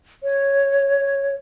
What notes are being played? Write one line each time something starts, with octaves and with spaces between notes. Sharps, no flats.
C#5